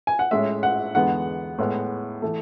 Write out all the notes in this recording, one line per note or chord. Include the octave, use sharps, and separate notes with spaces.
G#5
F#5
A2 G#3 C#4 E5
F#5
E2 D3 G#3 B3 F#5
A2 G#3 B3
E3 A3